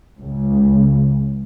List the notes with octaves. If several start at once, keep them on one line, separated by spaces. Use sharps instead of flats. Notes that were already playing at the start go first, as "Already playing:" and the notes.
C#2